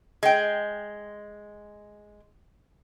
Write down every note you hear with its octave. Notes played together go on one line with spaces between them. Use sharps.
G#3 G5